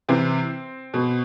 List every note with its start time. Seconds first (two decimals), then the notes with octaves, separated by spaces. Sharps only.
0.09 C3 E3 C4
0.94 B2